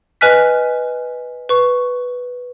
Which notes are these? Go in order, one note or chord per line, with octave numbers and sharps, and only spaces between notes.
B4 D#5 G#5 F6 F#6 B6
B4 C#6